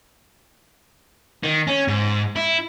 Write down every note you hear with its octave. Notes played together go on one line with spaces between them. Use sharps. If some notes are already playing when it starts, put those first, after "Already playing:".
D#3
C#4
G#2
E4